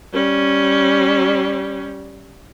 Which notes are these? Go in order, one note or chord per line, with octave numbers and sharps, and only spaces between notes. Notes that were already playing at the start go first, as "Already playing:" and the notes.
G3 C#4